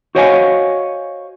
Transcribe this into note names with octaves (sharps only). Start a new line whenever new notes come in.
F#4 C5 C#5 D#5 F5 G#5